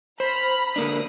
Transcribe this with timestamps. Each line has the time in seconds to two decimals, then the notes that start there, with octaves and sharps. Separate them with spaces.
0.20 C5 A#5 B5 F6
0.76 D3 A#3 D4 D#6